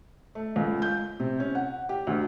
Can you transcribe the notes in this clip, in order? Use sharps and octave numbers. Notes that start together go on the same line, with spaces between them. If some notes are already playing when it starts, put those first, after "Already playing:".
A3
C#2
G6
C3
C#4
F#5
G4
D2